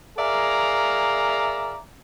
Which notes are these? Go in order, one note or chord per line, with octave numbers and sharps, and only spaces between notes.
G#4 A#4 D5 E5 F5 A#5